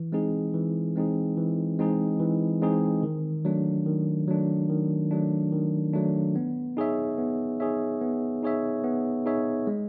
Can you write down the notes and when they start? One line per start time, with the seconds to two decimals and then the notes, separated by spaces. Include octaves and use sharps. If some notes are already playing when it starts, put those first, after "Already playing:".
Already playing: E3
0.12 G#3 C4 D#4 G#4
0.54 E3
0.96 G#3 C4 D#4 G#4
1.37 E3
1.79 G#3 C4 D#4 G#4
2.20 E3
2.62 G#3 C4 D#4 G#4
3.03 D#3
3.45 F#3 A3 D4
3.86 D#3
4.28 F#3 A3 D4
4.69 D#3
5.11 F#3 A3 D4
5.52 D#3
5.94 F#3 A3 D4
6.35 B3
6.77 D#4 G#4 C#5 E5
7.18 B3
7.60 D#4 G#4 C#5 E5
8.01 B3
8.43 D#4 G#4 C#5 E5
8.84 B3
9.26 D#4 G#4 C#5 E5
9.67 G#3